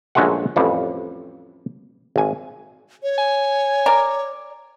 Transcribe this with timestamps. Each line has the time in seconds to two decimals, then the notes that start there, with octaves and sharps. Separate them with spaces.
0.15 A#1 F#2 G#3 A3 F#5
0.56 A1 F2 G3
2.16 G#1 G#5
3.03 C#5
3.18 G#5
3.86 A#4 D5